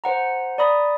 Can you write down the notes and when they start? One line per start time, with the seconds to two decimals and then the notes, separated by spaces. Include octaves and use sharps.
0.04 C5 F#5 A#5
0.58 D5 A#5 B5 D#6 A#6